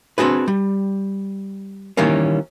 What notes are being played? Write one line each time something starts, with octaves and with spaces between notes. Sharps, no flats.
C4 D4 F#4 G#4 B4
G3
D#3 E3 G3 A#3 C#4